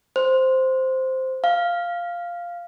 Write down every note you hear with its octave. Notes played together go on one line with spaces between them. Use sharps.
C5
F5